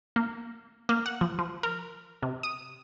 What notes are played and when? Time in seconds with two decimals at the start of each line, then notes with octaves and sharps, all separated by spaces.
0.16 A#3
0.89 A#3
1.06 F#5
1.21 F3
1.39 F3
1.63 A#4
2.22 C3
2.43 D#6